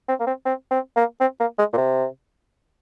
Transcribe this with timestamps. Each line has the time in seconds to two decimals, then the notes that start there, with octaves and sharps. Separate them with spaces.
0.08 C4
0.20 A#3
0.27 C4
0.46 C4
0.71 C4
0.96 A#3
1.21 C4
1.40 A#3
1.58 G#3
1.73 A#2
1.77 C3